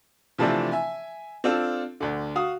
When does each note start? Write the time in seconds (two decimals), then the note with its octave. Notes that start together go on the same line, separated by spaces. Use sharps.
0.38 C3 E3 F3 A3 C4 D4
0.72 E5 G#5
1.44 C4 D4 F4 A4
2.00 D2 D3
2.35 F#4 F5 D#6